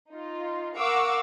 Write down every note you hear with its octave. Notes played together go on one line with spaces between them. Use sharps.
D#4 F4
A#4 F5 F#5 C#6 D6 E6